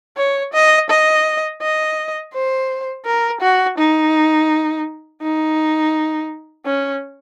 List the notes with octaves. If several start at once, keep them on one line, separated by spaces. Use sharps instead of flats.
C#5
D#5
D#5
D#5
C5
A#4
F#4
D#4
D#4
C#4